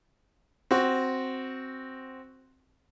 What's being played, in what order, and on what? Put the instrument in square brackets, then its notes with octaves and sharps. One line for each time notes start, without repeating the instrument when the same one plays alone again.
[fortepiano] C4 F#4